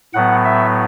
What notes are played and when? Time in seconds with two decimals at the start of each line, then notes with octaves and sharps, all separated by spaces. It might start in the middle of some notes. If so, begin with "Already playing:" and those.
0.14 A2 F#3 B3 F#5
0.45 E5